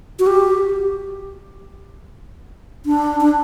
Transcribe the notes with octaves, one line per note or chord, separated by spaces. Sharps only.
F#4
G4
D4
D4